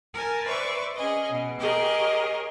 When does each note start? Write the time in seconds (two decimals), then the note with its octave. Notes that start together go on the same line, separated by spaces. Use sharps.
0.14 A#4 G#5 A5
0.44 B4 C5 D5 E5 C#6
0.96 C#4 G#4 D#5
1.31 B2
1.60 G4 G#4 A#4 C#5 D#5